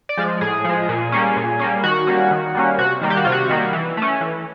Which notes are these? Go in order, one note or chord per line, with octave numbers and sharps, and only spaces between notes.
D5
F3 G#3
A2 G#4
F3 G#3
A#2
G3 A#3 C#4
A#2
G3 A#3 C#4
D#3 F#4
G3 A#3 C#4
D#3
G3 A#3 C#4
C3 F#4
D#3 G3 A#3
G4
F#4
C3 F4
F#4
D#3 G3 A#3
E3
A3 C#4
E3